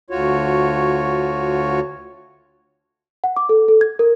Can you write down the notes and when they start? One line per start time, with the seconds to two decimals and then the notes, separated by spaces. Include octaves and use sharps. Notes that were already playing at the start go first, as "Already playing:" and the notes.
0.10 D2 F4 F#4 C#5
3.24 F#5
3.36 D6
3.49 A4
3.68 A4
3.81 G#6
3.99 A#4